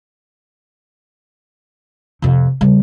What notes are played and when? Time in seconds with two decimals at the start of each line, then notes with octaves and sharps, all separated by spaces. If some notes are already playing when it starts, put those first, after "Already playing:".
2.22 F2 C3
2.61 C#3 G3